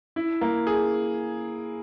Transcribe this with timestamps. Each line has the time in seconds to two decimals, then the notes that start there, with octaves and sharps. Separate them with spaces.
0.16 E4
0.41 A#3
0.67 G#4